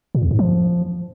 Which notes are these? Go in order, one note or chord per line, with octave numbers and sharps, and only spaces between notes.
A#2
E2
G#2
F3